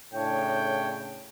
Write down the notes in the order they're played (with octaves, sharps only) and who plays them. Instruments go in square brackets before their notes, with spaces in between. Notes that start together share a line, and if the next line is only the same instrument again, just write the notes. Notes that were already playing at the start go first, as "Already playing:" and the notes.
[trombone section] A2 C#3 [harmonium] D4 C#5 [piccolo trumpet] G5